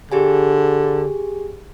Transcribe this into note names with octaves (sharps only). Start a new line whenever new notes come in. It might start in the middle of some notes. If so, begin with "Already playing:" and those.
D3 G4 G#4 G#5